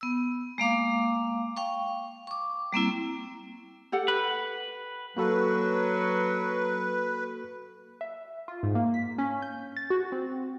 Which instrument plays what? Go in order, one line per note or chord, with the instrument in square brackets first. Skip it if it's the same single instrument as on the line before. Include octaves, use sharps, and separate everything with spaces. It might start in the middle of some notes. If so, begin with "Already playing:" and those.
[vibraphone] B3 E6
G#3 A#3 F5 D6
F5 G5 C#6
C#6 D6
G3 A#3 C4 E4
[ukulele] G4 A4 F#5
[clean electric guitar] B4
[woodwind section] F#3 [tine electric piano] A#3 F#4 A4 [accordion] B4
[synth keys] E5
F4
G#2
A#3
B6
C#4
G6
A6
F#4
C4